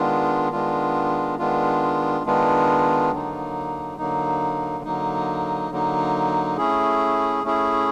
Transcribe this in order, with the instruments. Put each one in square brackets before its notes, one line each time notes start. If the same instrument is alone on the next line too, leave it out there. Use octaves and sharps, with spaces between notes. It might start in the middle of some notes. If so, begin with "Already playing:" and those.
Already playing: [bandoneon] D#3 G#3 B3 D4 F4
D#3 G#3 B3 D4 F4
D#3 G#3 B3 D4 F4
D#3 G#3 B3 D4 F4
D3 F#3 A#3 D#4
D3 F#3 A#3 D#4
D3 F#3 A#3 D#4
D3 F#3 A#3 D#4
A3 C#4 E4 G#4
A3 C#4 E4 G#4